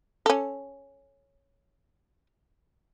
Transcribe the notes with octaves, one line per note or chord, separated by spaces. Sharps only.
C#4 A4